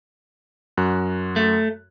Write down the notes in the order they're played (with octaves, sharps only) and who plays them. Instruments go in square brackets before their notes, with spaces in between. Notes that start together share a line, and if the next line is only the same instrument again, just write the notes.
[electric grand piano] F#2 F#4 F#6
[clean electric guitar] A3